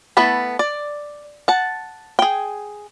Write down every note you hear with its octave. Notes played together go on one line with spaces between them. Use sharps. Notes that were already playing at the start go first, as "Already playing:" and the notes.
A3 B3 E4 A5 B5
D5
F#5 A5
G#4 G5